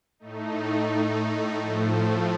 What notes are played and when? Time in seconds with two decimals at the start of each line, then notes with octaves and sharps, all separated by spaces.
0.19 A2 A3 D#4
1.60 A2 F3 A3